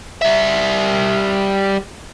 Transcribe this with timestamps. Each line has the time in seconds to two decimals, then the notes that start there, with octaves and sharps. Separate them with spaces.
0.22 G3 E5